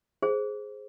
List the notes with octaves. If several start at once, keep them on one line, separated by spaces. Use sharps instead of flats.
G#4 C5